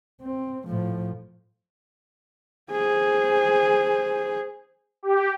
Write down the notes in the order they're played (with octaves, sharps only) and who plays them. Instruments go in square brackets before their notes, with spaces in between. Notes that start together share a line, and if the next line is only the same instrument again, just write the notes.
[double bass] C4
A2 F3
[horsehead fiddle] G#4 C5
[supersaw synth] G4